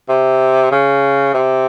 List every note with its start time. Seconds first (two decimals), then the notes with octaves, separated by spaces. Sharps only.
0.09 C3
0.72 C#3
1.34 C3